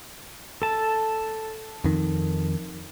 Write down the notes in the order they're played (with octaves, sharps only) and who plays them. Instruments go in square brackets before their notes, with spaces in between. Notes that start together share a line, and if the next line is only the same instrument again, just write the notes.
[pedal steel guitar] A4 A5
[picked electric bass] F2 D#3